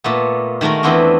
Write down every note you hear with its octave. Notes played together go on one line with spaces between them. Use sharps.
A#2 A3 B3
D#3 G#3 A3 F#4 A#4
E2 E3 B3 C4 D4 D#5